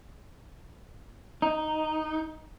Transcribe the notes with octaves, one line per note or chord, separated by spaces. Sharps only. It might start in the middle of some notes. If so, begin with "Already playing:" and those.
D#4